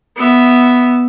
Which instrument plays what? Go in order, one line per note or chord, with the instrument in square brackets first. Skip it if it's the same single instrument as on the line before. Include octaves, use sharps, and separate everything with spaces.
[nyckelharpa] B3 E5